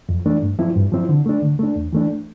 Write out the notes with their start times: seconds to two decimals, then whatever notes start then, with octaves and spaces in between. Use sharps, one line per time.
0.09 F2
0.26 E3 A3 D4
0.42 G2
0.59 F3 C4 E4
0.76 G2
0.92 F3 C4 E4
1.09 D3
1.26 A3 D4
1.42 D3
1.59 A3 D4
1.76 E2
1.93 E3 A3 D4